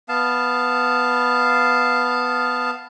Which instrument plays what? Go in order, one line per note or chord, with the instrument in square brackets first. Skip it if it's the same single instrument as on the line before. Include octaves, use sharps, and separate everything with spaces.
[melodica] B3 F5 A5